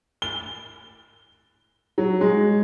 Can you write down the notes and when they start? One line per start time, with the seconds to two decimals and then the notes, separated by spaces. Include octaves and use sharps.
0.22 G7
1.98 F#3
2.21 G#3